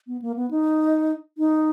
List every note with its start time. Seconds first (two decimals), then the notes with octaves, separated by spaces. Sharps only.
0.07 B3
0.22 A#3
0.36 B3
0.51 D#4
1.38 D#4